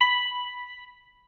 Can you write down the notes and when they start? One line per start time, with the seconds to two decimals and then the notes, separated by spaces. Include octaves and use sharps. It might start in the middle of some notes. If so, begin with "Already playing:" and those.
0.01 B5